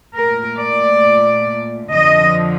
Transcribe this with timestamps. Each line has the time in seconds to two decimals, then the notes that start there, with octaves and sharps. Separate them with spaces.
0.15 A#2 A3 A#4
0.59 D5
1.91 F2 D3 F3 D#5